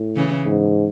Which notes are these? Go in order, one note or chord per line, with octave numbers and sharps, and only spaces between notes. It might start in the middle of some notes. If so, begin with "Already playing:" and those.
Already playing: A2
C#3 E3
G#2